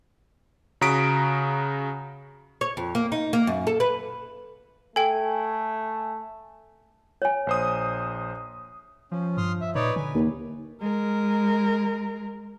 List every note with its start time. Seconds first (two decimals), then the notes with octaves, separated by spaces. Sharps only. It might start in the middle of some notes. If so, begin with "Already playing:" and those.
0.81 C#3 F#4 A#5 D#6 B6 D7
2.61 C#5
2.77 F2
2.95 A#3
3.12 D#4
3.33 A#3
3.47 F#2
3.67 A4
3.80 B4
4.96 A3 A4 G5 G#5
7.22 C#5 G#5
7.47 A#1 C5 D#6
9.11 F3 C#4
9.37 G2 C6 D#6 F6
9.61 E5
9.75 A#2 D#4 B4 C#5 D5
9.96 D3 G#5
10.14 D#2
10.81 G#3 A#4